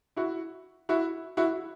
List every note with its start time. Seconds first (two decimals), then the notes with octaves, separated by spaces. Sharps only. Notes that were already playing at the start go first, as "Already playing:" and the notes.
0.16 E4 F#4
0.89 E4 F#4
1.37 E4 F#4